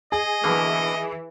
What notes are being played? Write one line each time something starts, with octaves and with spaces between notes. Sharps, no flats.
G#4 D#5
B2 D3 E3 A#3